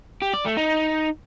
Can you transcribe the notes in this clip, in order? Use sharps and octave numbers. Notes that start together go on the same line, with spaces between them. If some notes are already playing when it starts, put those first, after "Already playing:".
G4
D5
A3
D#4